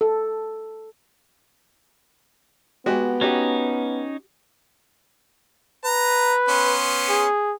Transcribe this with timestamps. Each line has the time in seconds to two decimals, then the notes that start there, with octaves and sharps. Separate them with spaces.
0.01 A4
2.86 G#3 B3 F#4 G4
3.21 C#4 D#4 F#4 G4
5.85 B4 A#5
6.48 B3 C#4 C6
7.10 G#4